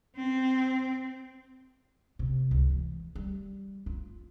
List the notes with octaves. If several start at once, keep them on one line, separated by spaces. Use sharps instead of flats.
C4
C3
C#2
E3
G3
F4